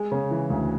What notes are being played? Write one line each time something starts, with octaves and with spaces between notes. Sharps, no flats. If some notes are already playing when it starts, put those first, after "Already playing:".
Already playing: G#3
C#3
E3
D2